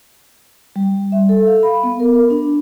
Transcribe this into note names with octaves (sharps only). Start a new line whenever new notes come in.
G3
E5
A4
F5
B5
B3
A#4
D4